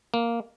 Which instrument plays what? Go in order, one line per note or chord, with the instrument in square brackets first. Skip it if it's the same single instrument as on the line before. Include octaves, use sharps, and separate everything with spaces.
[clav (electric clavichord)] A#3